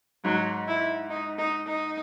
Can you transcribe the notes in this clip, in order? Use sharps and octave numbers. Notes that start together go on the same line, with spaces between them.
G#2 F#3
E4
D#4
D#4
D#4